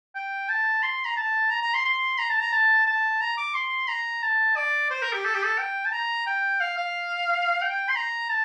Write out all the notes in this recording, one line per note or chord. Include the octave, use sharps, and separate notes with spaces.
G5
A5
C6
A#5
A5
A#5
A#5
C6
C6
A#5
A5
A#5
A5
A5
A#5
D6
C6
A#5
A5
D5
C5
A#4
G4
A4
G4
A4
G5
A5
A#5
G5
F5
F5
G5
C6
A#5
A5